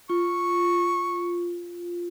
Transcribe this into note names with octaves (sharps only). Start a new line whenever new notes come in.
F4 C#6